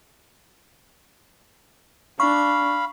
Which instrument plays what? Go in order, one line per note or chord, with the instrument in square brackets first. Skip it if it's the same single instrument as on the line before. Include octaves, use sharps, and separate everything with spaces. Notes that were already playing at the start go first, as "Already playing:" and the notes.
[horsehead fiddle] D4 [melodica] F5 B5 [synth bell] C#6